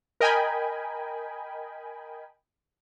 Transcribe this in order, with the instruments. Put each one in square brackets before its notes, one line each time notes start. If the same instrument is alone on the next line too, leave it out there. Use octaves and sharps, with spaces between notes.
[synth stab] A#4 D#5 G5 G#5 B5